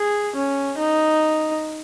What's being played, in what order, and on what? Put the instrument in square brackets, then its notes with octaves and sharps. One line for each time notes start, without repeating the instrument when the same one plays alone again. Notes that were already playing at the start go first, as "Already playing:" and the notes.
Already playing: [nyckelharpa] G#4
C#4
D#4